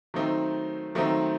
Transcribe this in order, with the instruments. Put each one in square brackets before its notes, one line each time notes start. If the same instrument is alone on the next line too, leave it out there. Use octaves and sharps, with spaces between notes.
[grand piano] D#3 F#3 A3 C4 D#4
D#3 F#3 A3 C4 D#4